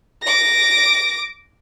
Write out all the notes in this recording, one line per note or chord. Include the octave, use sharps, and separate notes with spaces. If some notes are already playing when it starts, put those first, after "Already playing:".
D6 A#6